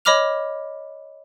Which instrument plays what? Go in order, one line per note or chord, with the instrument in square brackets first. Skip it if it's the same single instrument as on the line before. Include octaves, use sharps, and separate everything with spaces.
[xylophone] C#5 D#5 B5 D6 F6 F7